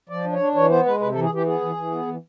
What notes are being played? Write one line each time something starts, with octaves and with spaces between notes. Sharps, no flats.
F3 D5
D4
C#5
D4
E3 C#5
B3 C5
G#3 B4
C3 B4
E3 A4
G#4
E3 G4
B3 G#4
E3
E3
B3
E3